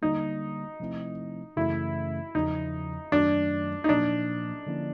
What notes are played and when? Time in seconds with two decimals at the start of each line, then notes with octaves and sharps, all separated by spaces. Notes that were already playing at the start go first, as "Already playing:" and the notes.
0.02 D3 G3 A#3 D#4
0.80 C3 F3 A3 C4 E4
1.56 F#2 C#3 E3 A3 C#4 E4
2.35 E2 C#3 F3 D#4
3.12 F#2 D#3 F#3 A3 D4
3.84 D#4
3.89 A#2 F3 A#3 D4
4.67 D3 F3 A#3 C#4 E4